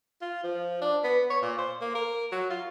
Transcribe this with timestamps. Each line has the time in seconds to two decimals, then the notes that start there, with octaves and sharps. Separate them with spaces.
0.22 F4
0.44 F3
0.82 D4
1.04 B3
1.30 C#5
1.42 A#2
1.58 C5
1.81 A#3
1.95 A#4
2.32 F#3
2.50 F4